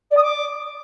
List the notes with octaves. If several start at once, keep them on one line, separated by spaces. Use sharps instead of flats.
D5
D#6
D6